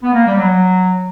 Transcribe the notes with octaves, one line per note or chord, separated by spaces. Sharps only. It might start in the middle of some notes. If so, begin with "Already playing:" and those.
B3
A#3
G3
F#3